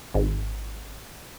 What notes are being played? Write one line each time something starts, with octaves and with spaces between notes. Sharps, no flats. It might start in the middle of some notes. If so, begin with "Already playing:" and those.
G#1